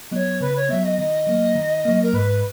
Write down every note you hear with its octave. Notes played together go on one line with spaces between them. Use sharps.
F#3 B3 C#5 D#5
C#3 B4
C#5
F#3 B3 E5
D#5
D#3 D#5
F#3 A#3
D#3
F#3 A#3
A#4
G#2 B4